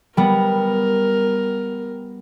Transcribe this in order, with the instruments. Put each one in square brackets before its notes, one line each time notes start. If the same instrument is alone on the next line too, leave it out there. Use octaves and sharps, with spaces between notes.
[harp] G3 B3 [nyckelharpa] A#4